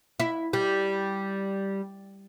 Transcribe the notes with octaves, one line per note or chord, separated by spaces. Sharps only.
E4
G3